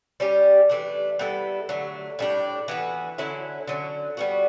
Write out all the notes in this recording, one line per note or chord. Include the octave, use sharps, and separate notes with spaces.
G3 C#4 G4
E3 A3 D4
G3 B3 E4 A4
D3 F#3 A3
A2 G3 D4
E3 B3 F#4
D3 F#3 C#4 E4
D3 F#3 C#4
G3 B3 F#4